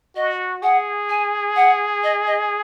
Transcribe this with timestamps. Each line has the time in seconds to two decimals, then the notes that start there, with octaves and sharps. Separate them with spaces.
0.16 F#4 D#5
0.62 G#4 F#5
1.09 G#5
1.56 F#5
2.03 D#5
2.27 D#5